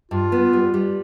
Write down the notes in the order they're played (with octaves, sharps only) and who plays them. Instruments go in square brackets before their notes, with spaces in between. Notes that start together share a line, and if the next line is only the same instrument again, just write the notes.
[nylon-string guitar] G2 [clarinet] F4
[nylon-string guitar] B3
G3
G3